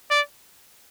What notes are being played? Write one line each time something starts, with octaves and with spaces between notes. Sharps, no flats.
D5